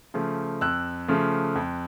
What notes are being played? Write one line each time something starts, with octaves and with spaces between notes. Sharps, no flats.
C#3 F3 A3
F2 E6 F#6
C#3 F3 A3
F2